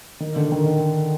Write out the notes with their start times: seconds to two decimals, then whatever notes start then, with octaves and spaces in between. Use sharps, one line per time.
0.20 D#3
0.36 D3
0.52 D#3